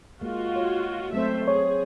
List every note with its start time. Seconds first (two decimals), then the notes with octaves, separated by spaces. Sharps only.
0.21 G#3 A#3 F4 F#4
0.56 C#5
1.13 F#3 A3 C4 C5 E5
1.48 G#4 C#5